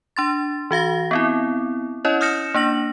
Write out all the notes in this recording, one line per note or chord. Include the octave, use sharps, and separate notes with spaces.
D4 C6 A6
E3 F#4 F5 A#6
B3 C4 E4
C#4 E4 C#5 D#5
D#6 F6 G6 A#6 C#7 E7
A#3 D4 A#6 F#7